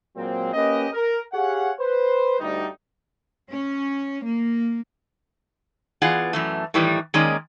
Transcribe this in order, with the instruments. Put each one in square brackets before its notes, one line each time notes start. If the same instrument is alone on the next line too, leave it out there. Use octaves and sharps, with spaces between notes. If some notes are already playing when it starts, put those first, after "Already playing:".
[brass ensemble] A#2 F#3 G#3 A#3 C4
A#3 C#4 G4 B4 D#5
A#4
G4 G#4 C#5 F5 F#5
B4 C5
D2 G3 D#4
[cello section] C#4
A#3
[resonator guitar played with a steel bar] E3 B3 F4 G#4 D5 F#5
F#2 E3 A3
A2 D#3 E3 G3
D#3 G#3 A#3 C#4 D5 D#5